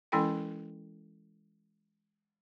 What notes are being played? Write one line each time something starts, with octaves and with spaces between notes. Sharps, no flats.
E3 G#3 C#4 E4 A4 G5